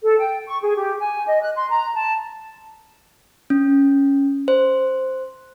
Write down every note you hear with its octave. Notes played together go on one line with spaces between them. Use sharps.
A4
G5
C#6
G#4
G4
G#5
D#5
F#6
C6
A#5
A5
C#4
C5